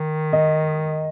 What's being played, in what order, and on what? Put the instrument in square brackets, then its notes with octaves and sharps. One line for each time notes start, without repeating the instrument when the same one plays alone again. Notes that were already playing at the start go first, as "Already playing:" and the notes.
Already playing: [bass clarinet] D#3
[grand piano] D#5